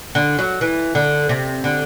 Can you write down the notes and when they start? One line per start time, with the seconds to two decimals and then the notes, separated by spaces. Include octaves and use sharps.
0.15 D3
0.39 F#3
0.61 E3
0.95 D3
1.29 C3
1.64 D3